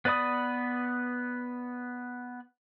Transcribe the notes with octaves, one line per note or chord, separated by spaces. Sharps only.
B3 B4 D5 B5 D#6